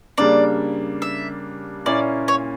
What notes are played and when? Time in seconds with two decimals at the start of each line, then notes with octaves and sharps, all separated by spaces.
0.18 C#3 G3 A#3 D4 D5
1.02 E5
1.85 A#2 A#3 C#4 E4 D5
2.28 C#5